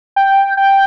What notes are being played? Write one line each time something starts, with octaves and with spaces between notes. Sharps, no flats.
G5
G5